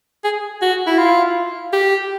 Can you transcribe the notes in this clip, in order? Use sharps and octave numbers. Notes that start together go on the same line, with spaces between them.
G#4
F#4
E4
F4
G4